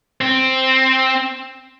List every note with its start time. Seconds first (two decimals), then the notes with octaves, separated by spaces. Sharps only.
0.21 C4